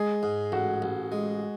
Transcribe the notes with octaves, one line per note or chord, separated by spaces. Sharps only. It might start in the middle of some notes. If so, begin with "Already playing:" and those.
Already playing: G#3 G#4
G#2
A1 F#4
A1
G#3